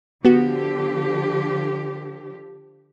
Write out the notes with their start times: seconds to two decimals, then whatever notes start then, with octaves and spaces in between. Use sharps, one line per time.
0.25 D3 F3 B3 F#4 G4